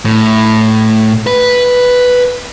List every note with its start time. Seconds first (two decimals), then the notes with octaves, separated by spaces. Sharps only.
0.05 A2
1.27 B4